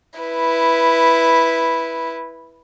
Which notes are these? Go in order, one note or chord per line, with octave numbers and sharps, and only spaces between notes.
E4 B4